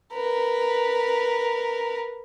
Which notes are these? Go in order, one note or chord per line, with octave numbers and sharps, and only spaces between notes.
A#4 B4